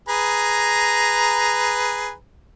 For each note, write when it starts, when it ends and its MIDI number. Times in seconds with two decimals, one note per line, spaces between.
0.08 2.13 68
0.08 2.13 71
0.08 2.13 82